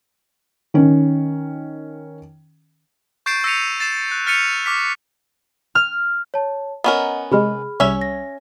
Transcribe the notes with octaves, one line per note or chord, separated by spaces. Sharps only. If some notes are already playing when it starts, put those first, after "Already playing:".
D#3 C#4
C#6 G6 A6 C7 D7 E7
E6 A#6 B6 C#7 D#7 F7
A6 C7 E7
F#6
F6 A6 B6 C#7 D#7 F7
C#6 D6 F6 B6
F6
C#5 A5
B3 C#4 A#4 D#5 F#5 A#5
C3 G#3 G#4 B5 F6
C2 G3 C#4 C#5 E5
A#6